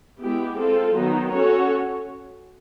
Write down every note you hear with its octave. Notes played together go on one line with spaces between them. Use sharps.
G#3 B3 E4 G4
C4 F4 A4
D#3 F#3 B3 D#4
C#4 F#4 A4 C#5